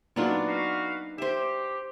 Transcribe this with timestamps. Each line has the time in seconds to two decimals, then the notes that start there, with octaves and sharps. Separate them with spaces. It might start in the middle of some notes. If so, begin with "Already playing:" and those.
0.16 A#2 F#3 B3 D4 D#4 F4
0.48 F#4 B4 F5
1.18 G4 C5 E5